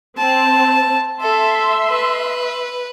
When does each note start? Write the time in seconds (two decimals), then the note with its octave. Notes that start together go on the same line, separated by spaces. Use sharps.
0.18 C4 A5
1.21 A4 E5 C6
1.89 B4